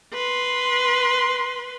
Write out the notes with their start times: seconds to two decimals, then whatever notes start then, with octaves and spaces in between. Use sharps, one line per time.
0.14 B4 C6